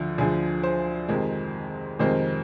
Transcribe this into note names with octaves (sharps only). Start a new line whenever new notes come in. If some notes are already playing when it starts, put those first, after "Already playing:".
Already playing: D2 D3 F3
D2 D3 F3 G#4
C5
F2 C3 D#3 G#3 C4
F2 C3 D#3 G#3 C4